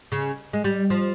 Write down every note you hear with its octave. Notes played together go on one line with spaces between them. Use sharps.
C#3
G#3
G3
F3